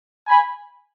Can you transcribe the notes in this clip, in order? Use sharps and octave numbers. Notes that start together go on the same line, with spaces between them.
G#5 B5